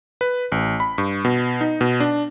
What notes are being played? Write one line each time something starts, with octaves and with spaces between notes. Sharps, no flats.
B4
A1
B5
G2
B2
D#4
B2
D4